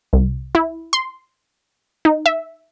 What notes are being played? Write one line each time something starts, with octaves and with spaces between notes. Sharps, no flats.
C2
E4
C6
D#4
E5